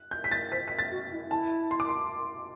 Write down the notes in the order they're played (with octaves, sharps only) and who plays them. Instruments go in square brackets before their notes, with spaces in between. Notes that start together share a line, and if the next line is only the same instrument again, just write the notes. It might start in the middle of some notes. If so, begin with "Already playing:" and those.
Already playing: [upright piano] F#6
G6
B6
A6
[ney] C5 [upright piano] B6
[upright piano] B6
A6
[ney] F#4
E4
[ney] E4 [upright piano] A5
[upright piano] C6
D6
C6